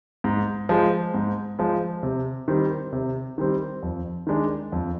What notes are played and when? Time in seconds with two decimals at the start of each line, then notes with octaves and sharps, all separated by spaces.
0.24 G#2
0.69 F3 G#3
1.14 G#2
1.59 F3 G#3
2.03 C3
2.48 D#3 G3 C4
2.93 C3
3.38 D#3 G3 C4
3.83 F2
4.27 D#3 G#3 D4 G#4
4.72 F2